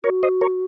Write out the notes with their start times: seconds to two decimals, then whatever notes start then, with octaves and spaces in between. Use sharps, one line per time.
0.04 F#4 A#4 C#5
0.23 C5 D#5
0.41 A#4 C#5